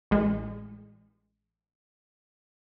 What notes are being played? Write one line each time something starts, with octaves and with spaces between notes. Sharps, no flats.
A1 G#3